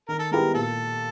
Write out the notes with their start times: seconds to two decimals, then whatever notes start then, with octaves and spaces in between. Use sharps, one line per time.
0.09 D#3 A#4
0.19 A4
0.31 G#3 B3 E4 G4 A#4
0.54 A#2 A4